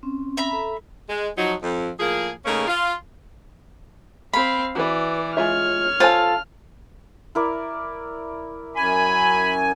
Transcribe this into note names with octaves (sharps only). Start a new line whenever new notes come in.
C4 C#4
E5 A#5 B5
A4
G#3
F3 F#3 D#4
F2
A2 F3 A#3 G#4
C#3 A3 A#3 C#4 D#4 G#4
F4
C4 F5 B5
E3 F#4 B4 D5
G#3 F4 C#5 E5 F6
F4 A4 C5 G#5 A5
E4 A#4 D5
F#2 G#5 B5